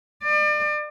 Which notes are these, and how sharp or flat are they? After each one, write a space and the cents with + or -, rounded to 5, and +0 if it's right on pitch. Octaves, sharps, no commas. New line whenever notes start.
D5 +35